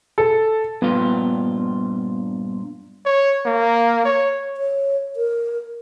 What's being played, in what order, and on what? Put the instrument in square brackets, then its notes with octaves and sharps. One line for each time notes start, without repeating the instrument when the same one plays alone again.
[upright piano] A4
[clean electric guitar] G2 A#2 F4 [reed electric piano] B3
[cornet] C#5
A#3
C#5
[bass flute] C#5
A#4